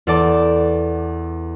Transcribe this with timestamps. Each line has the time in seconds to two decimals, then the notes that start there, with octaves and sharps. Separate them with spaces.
0.07 E2 A4 D5